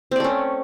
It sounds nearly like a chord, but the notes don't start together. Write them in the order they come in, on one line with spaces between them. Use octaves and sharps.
C4 D5 A3 C#4